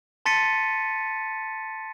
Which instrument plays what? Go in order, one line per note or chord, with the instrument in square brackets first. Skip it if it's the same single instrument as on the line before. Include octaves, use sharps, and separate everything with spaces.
[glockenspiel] A5 C6 A6 B6 C#7 D#7